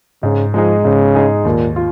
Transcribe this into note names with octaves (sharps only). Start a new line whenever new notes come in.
G#2 C#3
F3 G#3 D#4 G#4
G#2 C#3
G#3 D#4 G#4
D#2 A#2
F4